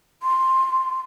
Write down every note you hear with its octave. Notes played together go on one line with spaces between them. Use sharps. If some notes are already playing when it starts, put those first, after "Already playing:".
C6